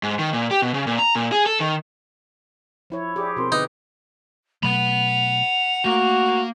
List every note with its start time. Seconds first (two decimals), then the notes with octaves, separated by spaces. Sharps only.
0.03 G#2
0.19 D#3
0.33 A#2
0.51 G4
0.62 B2
0.74 C#3
0.87 A#2
0.99 A#5
1.15 A#2
1.32 G#4
1.46 A4
1.60 D#3
2.90 F3 E4 C#5
3.16 E4 G4 G#4 D5 D6
3.37 B2 C4 A#4 C6
3.52 D3 D#4 B4
4.63 B2 F#3 A3 F#5 B5 F7
5.85 A3 A#3 F#4